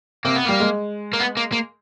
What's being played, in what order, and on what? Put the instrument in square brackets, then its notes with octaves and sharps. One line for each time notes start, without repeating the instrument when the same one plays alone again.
[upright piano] C3 [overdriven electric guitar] A#3
[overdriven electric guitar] B3
[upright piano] G3 [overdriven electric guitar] A#3
[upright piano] G#3
[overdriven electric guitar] A#3
B3
A#3
A#3